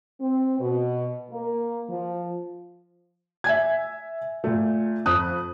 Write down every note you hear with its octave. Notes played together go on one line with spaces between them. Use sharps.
C4
B2
A#3
F3
E5 G#5 G#6
A#2 A3
F2 D#6 F#6